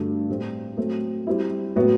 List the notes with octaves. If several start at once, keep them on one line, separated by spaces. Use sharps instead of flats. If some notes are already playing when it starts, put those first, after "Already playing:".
Already playing: G2 D3 A3 D4 F#4
A2 G3 C4
F#3 A3 C4
G3 C4 E4
A2 F#3 B3 F#4